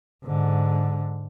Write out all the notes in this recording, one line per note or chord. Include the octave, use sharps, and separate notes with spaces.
G#2 D3